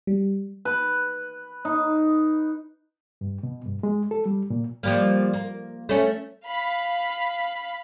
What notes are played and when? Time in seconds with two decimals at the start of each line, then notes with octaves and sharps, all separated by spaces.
0.07 G3
0.65 B4
1.65 D#4
3.21 G2
3.43 B2
3.66 G2
3.83 G#3
4.11 A4
4.26 G3
4.50 A#2
4.83 F3 G3 A#3
5.33 A#3
5.89 A3 C#4
6.45 F5 B5